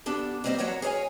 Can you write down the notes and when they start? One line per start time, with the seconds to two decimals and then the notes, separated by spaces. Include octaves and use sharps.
0.06 D3 B3 D4 G4 A4
0.44 G3 A#3 C4 D5 D#5
0.59 E2 D3 F#3 A#4 C#5 F#5
0.82 G#4 A#4 C#5 E5 G#5